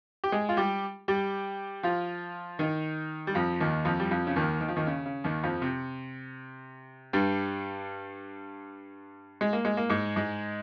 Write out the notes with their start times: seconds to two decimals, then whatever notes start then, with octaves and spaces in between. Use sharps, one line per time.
0.24 G4
0.32 G#3 G#4
0.49 F4
0.57 G3 G4
1.08 G3 G4
1.83 F3 F4
2.59 D#3 D#4
3.27 G3
3.35 F2 F3
3.60 D#2 D#3
3.85 F2 F3
4.00 G3
4.11 F2 F3
4.27 C#3
4.36 D#2 D#3
4.61 D#3
4.68 F3
4.76 D#2 D#3
4.87 C#3
5.06 C#3
5.24 D#2 D#3
5.44 F2 F3
5.62 C3
7.13 G2 G3
9.41 G#3
9.53 A#3
9.65 G#3
9.77 A#3
9.90 G#2 G#3
10.16 G#2 G#3